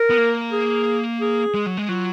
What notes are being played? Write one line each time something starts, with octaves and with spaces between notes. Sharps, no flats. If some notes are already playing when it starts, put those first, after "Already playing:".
Already playing: A#4
B3
A#3
G#4
G#4
G#3
F#3
G#3
F#3 F4